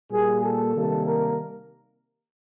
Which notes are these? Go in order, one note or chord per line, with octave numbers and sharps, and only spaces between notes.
A#2 G3 A#3 G#4
A4
C3 D#3 G3 A#3
A#4